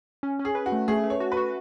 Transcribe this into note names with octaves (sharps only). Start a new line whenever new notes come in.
C#4
C#4
G#4
B4
F#4
A3
A3 G#4
A3
C#5
F#4
B4
F#4